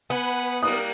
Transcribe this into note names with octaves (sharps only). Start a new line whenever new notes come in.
B3 B4 F#5 G#5
G3 A#3 A#4 D#6 F#6